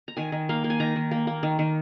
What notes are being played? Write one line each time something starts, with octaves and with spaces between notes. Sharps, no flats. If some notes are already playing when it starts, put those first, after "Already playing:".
A#5
D#3 G#5
D#3
A#3 F5
A#3
G#5
D#3 A#5
D#3
A#3
A#3
D#3
D#3